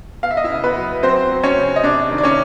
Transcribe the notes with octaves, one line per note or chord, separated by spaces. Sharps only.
B3 F5
E5
D#5
E4 E5
C#3
B3 B4
F#3
F#3 C4 C5
F#3
C#4 C#5
C#3
D#5
C3 D4 D5
D#3
D5
C#4 C#5